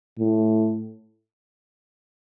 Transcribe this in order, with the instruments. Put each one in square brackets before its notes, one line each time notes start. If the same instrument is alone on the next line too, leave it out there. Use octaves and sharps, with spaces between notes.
[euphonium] A2